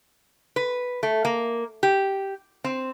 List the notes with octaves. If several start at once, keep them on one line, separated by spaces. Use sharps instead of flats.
B4
A3
A#3
G4
C4